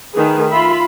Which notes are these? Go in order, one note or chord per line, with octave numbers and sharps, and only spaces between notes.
D#3 A3 G#4 B4
F4 E5 B5